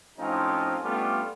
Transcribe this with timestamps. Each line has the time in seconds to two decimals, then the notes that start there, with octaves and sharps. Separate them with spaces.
0.19 A2 F3 C4 C#4 D#4 F4
0.82 G3 A3 B3 C#4 D4 F4